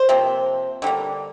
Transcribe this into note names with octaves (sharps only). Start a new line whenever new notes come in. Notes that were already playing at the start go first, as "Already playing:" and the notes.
Already playing: C5
C3 F3 A#3
D3 G3 A#3